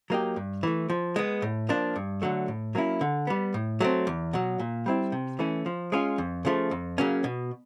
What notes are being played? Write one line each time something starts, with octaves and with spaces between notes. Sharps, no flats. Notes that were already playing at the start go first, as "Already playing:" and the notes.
F#3 A#3 D#4 G4
G2
E3 A3
F3
G#3 B3
A2
F3 A#3 D4
G2
D3 F#3 A3
A2
F#3 A#3 C#4 E4
D3
G3 B3
A2
F#3 A3 C4
E2
B2 F#3
A#2
G3 C4 E4
C3
E3 A3 C#4
F3
G#3 C#4 F4
F2
C#3 F3 A3
F2
C#3 F#3 A#3 C#4
B2